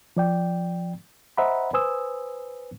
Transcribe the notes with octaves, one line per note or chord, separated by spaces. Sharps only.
F3 D5 G5
C5 D#5 E5 F#5 A#5 B5
B4 C5 G#5 D#6 E6